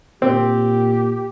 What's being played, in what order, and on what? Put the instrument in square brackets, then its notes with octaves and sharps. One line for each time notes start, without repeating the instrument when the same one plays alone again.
[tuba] A#2 [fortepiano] C4 [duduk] G4